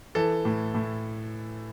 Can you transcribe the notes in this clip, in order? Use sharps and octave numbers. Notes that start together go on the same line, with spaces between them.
E3 A4
A2
A2